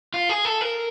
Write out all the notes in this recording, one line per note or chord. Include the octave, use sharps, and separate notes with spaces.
F4
G#4
A4
A#4